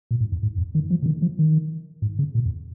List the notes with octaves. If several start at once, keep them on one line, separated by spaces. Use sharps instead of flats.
A#2
G#2
F2
G#2
F2
D#3
F3
C#3
D#3
F3
D#3
G#2
C#3
A#2
F2